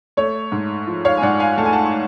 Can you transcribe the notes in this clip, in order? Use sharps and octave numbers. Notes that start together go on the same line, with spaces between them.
A3 C#5
G#2
F3
C#5 F5
G#5
G#2 D5 F#5
F5 G#5
A3 A5
G#5
F#5 A5
C#6